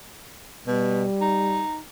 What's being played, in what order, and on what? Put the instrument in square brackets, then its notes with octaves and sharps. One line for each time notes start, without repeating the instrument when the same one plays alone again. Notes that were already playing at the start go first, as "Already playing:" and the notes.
[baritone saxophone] B2 [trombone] G3
[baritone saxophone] D#4